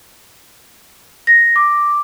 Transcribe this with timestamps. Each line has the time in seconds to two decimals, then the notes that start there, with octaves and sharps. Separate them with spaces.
1.27 A#6
1.56 D6